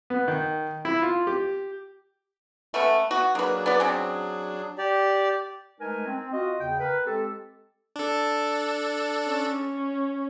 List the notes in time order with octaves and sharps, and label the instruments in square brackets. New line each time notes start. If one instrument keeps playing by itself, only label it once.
[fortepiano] B3
D#3
E4
F4
G4
[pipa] A3 B3 C#4
[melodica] B3 [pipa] F#4
[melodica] F#3 D4 G#4 [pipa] A#3 B4
[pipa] B3 D5
C4 C#4
[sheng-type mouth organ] G4 D5
[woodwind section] G#3 A3 D#4 A#4 B4 G#5
C4
F4 F#4 D#5
E2 C#3 G5
A#4 B4
G#3 C4 G4 A4
[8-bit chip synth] D4 A4
[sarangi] C#4